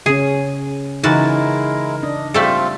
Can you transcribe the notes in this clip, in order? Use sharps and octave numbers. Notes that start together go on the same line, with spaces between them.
C#3 C#4 G#4
C#3 E3 G#3 D#4 E4 F#4 A#4 A5
D4 D#5
G3 A3 C4 F4 A4